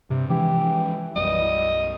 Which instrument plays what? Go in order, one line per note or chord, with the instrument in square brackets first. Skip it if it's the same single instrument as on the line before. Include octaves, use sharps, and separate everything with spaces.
[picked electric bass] G2 [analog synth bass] C3
[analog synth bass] E3 [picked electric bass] F3 G#3 C#4 [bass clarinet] G4
[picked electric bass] B1 F#2 F#3 [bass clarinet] G3 [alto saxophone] D#5